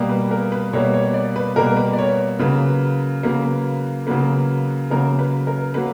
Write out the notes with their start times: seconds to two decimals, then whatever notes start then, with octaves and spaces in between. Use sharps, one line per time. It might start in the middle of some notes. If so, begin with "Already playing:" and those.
Already playing: B2 G3 A#3
0.09 B4
0.31 A#4
0.52 B4
0.73 B2 G3 A#3 C#5
0.94 C#5
1.14 D5
1.36 B4
1.56 B2 G3 A#3 A#4
1.77 B4
1.93 D5
1.98 C#5
2.39 C#3 F#3 A#3 B4
3.23 C#3 F#3 A#3 B4
4.07 C#3 F#3 A#3 B4
4.91 C#3 F#3 A#3 A#4
5.19 B4
5.47 A#4
5.74 F#3 A#3 B4